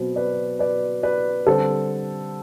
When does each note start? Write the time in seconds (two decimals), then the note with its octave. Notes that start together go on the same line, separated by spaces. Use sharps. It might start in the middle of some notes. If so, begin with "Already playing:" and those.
Already playing: B2 F#3 C4
0.16 B4 D5
0.59 B4 D5
1.03 B4 D5
1.47 D3 G3 C4 A4 C5